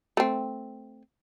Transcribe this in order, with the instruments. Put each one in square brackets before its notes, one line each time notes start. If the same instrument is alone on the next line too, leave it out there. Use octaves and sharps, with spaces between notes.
[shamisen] A3 C4